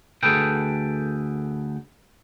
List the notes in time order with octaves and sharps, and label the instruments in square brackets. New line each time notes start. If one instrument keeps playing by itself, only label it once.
[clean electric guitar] D2 G#4 A4 B4 G5